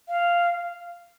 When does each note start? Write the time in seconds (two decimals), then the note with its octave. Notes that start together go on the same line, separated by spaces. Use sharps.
0.09 F5